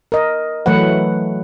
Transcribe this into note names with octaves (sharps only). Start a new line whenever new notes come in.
A#4 D#5
E3 F#3 A3 B4 F#5